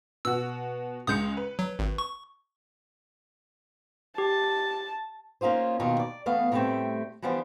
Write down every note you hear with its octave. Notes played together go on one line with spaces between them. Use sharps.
B2 F#4 E6
C#2 G#3 D#6 G6 C#7
B4
F#3
G#1
C#6
G4 A5
A#3 C#4 D#4 F4 C5
D#2 B2 D#3 D4 D#4 F4
D5
E2 A3 B3 F5
A2 D#3 G3 A3 C4 G5
E3 F3 G3 B3 D4 C5